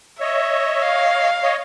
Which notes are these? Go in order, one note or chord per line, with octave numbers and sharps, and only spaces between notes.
C#5 D#5 E5
F5
C#5 D#5